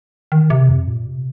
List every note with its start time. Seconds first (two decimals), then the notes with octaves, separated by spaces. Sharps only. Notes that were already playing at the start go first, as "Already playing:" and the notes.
0.32 D#3
0.50 C3
0.69 F2
0.88 A#2
1.06 C3